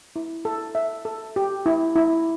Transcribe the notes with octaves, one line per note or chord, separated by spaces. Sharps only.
E4
A4
E5
A4
G4
E4
E4